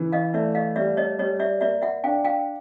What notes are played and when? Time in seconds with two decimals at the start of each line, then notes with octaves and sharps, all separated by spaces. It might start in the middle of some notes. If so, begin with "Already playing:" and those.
Already playing: C#3 E3
0.12 D#5 F5
0.34 A3 D5 E5
0.55 D#5 F5
0.76 G3 D5 E5
0.97 C#5 D#5
1.19 G3 C#5 D#5
1.40 D5 E5
1.61 A#3 D5 E5
1.82 E5 F#5
2.04 D4 F5 G5
2.24 F5 G5